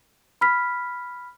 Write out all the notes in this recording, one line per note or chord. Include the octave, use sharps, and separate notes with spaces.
B5 F6 B6